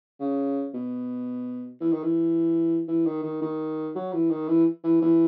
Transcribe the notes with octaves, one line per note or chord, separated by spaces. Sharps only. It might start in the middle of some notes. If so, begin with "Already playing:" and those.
C#3
B2
E3
D#3
E3
E3
D#3
D#3
D#3
F#3
E3
D#3
E3
E3
E3